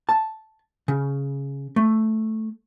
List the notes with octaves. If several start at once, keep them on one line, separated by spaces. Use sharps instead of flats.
A5
C#3
A3